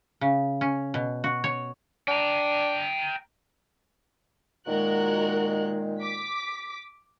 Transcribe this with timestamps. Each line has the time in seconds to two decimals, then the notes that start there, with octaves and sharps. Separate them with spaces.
0.21 C#3
0.61 C#4
0.94 B2
1.24 F#4
1.44 C#5
2.08 D4 G5 A#5
4.67 A#2 D#3 G#3 F#4 A#4 F#6
6.01 D6 B6